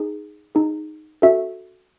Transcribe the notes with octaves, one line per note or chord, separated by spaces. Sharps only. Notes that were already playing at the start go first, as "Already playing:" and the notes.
Already playing: D#4 G#4
D#4 G#4
C#4 F#4 A4 E5